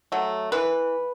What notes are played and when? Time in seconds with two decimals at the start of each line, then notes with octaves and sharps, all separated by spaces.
0.12 F#3 A3
0.52 E3 B4